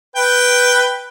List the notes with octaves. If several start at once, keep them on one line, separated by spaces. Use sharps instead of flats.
B4 G5